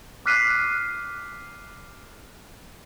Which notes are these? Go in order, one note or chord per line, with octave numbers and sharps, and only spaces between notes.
D6 F6 F#6 B6 C7 D#7